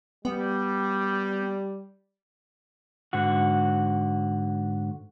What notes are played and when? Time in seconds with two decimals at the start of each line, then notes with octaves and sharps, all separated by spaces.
0.25 G3 B3
3.13 G#2 D3 F#4